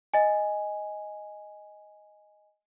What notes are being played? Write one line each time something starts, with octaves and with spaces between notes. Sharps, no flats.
D#5 G#5